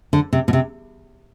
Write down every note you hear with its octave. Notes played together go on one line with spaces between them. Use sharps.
D3
C3
B2
C3